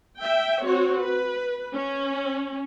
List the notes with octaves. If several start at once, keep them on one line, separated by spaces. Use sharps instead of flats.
E5 G5
C4 F#4 C#5
B4
C#4